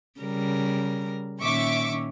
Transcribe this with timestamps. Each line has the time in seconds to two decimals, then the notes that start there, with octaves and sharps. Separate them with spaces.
0.20 C#3 G3 A#4
1.40 A#2 D#3 C#4 E5 C#6 D6